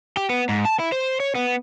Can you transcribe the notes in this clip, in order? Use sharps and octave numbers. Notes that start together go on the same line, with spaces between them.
G4
B3
G#2
A5
E4
C5
C#5
B3